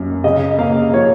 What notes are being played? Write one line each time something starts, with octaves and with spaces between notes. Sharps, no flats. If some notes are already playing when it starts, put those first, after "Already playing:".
Already playing: F#2 A#3
C#3 D#5
A#3 F5
F3 C#5